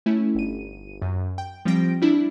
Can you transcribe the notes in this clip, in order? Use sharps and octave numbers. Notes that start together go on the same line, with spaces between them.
A3 C#4 E4
G1 D#7
F#2
G5
F3 G3 C4 G5 A#6 D7
G3 D4 E4